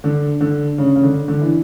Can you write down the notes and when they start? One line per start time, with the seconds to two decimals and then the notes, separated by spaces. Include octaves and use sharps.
0.04 D3
0.41 D3
0.78 C#3
0.96 C#3
1.03 D3
1.28 D3
1.41 E3